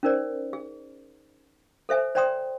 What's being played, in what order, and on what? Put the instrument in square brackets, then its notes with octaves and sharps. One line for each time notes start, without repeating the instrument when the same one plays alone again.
[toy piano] C#4 D#4 A#4 C5 D5
G#4
A4 C5 E5 G#5
C5 D5 G5 A#5 C6 D#6